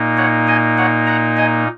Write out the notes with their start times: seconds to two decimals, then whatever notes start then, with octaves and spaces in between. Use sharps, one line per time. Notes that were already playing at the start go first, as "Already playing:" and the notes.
Already playing: A#2 A#3 D#4
0.17 C#5 F#5
0.47 D#5 G#5
0.77 C#5 F#5
1.07 F#5 A#5
1.37 D#5 G#5